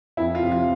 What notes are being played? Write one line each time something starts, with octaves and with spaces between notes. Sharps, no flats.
F2 E4
F4
C3 F3
F4